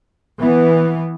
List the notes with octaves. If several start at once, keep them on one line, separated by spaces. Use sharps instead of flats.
E3 B3